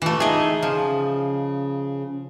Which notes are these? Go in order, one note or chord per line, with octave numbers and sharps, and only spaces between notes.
D#2 E3 A3 F4
D#4 G#4 D#5 E5
C#3 F3